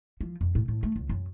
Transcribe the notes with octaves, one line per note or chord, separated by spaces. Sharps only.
F3
F2
A2
A2
A3
C#2
F#2